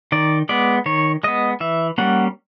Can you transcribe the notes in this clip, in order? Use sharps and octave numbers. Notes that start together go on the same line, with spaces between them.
D#3 D5
G#3 B3 D5
D#3 C#5
G#3 B3 D#5
E3 E5
G3 A#3 C#4 F#5